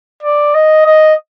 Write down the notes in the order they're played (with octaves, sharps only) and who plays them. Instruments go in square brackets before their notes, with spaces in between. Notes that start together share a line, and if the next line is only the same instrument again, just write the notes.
[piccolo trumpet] D5
D#5
D#5